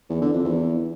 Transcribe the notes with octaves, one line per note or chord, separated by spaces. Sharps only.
E2
D3
F2
E2